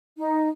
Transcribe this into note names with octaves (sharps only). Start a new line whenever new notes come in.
D#4